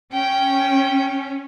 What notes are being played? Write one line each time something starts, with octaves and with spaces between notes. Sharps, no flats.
C#4 G5